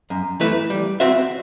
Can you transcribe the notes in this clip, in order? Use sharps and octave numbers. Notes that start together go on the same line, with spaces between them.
F#2
E3 A3 E4 B4
G3
C4 F#4 C5 E5